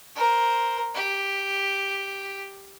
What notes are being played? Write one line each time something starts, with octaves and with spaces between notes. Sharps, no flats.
A#4 C5
G4